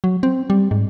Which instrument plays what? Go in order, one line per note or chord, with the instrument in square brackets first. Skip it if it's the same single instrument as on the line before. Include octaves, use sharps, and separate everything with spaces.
[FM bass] F#3
C4
G3
G#2